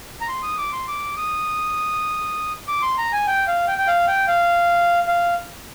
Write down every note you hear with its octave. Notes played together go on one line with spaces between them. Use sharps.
A#5
C6
D#6
D6
C6
D6
D#6
D6
C6
A#5
G#5
G5
F5
G5
G5
F5
G5
F5
F5